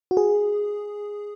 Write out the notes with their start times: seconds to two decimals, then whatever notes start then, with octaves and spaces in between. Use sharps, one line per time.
0.11 F#4
0.17 G#4